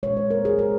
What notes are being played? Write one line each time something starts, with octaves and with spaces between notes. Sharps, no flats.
A#2 G#3 C#5
C5
A#4
G#4
A#4